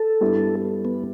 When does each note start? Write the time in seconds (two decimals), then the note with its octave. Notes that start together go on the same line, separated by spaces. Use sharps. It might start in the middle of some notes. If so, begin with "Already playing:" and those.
Already playing: A4
0.21 G2 G3 B3 E4
0.85 B3